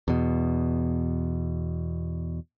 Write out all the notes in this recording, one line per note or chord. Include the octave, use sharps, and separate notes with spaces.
E2 B2